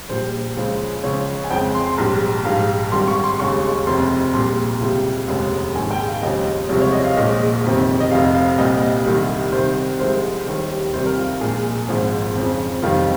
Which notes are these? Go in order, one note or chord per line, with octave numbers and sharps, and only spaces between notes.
A#1 A#2 G3 C5
C#2 C#3 F3 G#3
C#2 C#3 F3 C#5
G#5
F2 C#3 G#3 G5
C6
C6
A#1 G#2 G3 A#5
A#1 G#2 G3 F5
G#1 G2 G3 C6
C#6
C6
D#2 C#3 G#3 C#6
F1 F2 C3 C6
A#1 A#2 G3 C6
C#2 C3 G3
F1 D#2 C#3 G#3
A#1 G#2 D#3 G#3 G#5
G5
F5
D#2 C#3 F3 G#3 D#5
C2 C3 F3 G#3 C#5
C#5
D#5
F5
A#1 A#2 G#3 D#5
G1 F2 C3 D#3
D#5
F1 F2 C3 F5
F5
C2 A#2 G3 D#5
C2 C3 D#3 G3
C2 C3 D#3 C5
C2 C3 F3 G#3 C5
D#2 D#3 G3
C2 C3 D#3 G3 C5
A#4
F4
A#1 A#2 G#3 G#4
G#1 G#2 F3 G#3
F2 C#3 F3
F1 F2 D#3 G3 F4